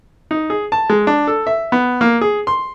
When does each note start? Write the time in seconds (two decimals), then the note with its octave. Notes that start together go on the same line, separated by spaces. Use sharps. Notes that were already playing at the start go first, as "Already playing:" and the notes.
0.31 D#4
0.50 G#4
0.72 A5
0.90 G#3
1.07 D4
1.27 A4
1.47 E5
1.72 B3
2.01 A#3
2.21 G#4
2.47 C6